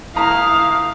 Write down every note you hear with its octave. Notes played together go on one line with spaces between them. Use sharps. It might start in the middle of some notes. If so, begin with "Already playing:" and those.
G1 A3 E4 F5 A#5 D#6